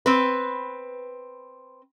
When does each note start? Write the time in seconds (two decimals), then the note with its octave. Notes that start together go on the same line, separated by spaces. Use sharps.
0.06 C4 B4